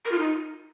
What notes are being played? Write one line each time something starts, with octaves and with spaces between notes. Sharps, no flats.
A#4
F4
D#4